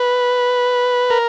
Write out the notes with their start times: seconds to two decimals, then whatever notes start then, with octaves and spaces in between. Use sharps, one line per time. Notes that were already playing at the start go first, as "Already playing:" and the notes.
Already playing: B4
1.10 A#4